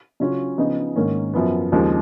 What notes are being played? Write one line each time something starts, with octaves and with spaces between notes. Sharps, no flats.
C#3 F#3 C#4 F4
C#3 F3 B3 D#4
G#2 D#3 A#3 C#4
F#2 F3 B3
D#2 C#3 F3 G#3 D#4